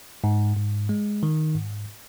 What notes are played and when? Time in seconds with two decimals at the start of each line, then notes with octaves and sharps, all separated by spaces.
0.24 G#2
0.56 G#2
0.89 G#3
1.23 D#3
1.55 G#2